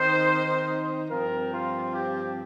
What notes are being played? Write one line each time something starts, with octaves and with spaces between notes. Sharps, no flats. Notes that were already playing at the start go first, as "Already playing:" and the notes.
Already playing: D#3 C4 D#4 C5
G2 F3 C4 A#4
F4
G4